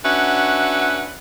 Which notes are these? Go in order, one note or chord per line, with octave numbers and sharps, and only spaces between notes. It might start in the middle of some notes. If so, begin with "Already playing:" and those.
C#4 D4 F#4 B4 E5 F#5